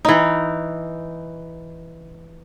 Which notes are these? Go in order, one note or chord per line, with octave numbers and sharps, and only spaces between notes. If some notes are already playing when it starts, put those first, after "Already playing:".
E3 D#4